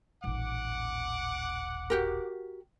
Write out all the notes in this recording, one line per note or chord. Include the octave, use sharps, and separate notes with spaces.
D#1 A1 F#5 D6
F#4 G4 A#4